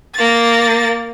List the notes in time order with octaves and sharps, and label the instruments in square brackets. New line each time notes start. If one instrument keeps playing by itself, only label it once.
[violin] A#3 A6